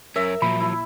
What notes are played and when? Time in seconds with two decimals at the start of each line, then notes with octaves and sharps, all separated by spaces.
0.16 F#2 C#4 A#4 E5
0.42 A#2 F3 F#3 A#3 B5
0.60 E4